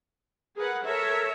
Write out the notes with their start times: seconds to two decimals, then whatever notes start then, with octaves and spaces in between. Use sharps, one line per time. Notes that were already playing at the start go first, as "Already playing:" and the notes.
0.56 G#4 A#4 B4 F#5
0.84 A4 A#4 C#5 E5